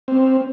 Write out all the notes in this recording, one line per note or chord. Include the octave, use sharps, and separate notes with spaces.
C4